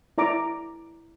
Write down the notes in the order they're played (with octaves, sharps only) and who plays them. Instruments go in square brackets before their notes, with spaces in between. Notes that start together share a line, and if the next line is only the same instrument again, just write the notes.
[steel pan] E4 D5 A#5 D6